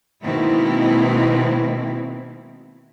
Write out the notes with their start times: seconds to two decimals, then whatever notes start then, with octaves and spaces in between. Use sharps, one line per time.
0.24 B2 D#3 G#3 A#3 C4 E4